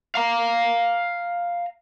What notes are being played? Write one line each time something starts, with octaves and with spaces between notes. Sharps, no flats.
F5 A#5